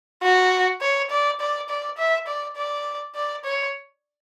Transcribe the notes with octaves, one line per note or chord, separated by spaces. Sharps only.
F#4
C#5
D5
D5
D5
E5
D5
D5
D5
C#5